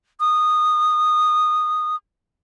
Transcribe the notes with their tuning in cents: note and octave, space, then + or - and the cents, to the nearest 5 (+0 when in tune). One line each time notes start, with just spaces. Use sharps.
D#6 -15